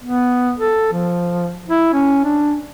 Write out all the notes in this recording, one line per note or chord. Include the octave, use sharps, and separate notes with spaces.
B3
A4
F3
E4
C#4
D4